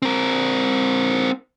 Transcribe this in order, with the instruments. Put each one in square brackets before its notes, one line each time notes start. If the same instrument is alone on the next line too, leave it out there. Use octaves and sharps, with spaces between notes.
[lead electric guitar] C4 A#4